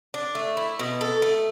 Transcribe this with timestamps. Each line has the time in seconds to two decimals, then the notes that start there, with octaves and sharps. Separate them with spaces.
0.14 D4
0.35 A3
0.57 E4
0.79 B2
1.01 A4
1.22 A3